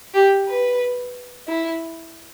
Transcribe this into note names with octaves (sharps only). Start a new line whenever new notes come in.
G4
B4
E4